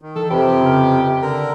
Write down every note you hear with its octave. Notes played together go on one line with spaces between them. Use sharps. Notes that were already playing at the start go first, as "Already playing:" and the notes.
D#3
E3 A4
F2 C3 G4 B4 C5 B5
C#3 B4 F6
D3 A#4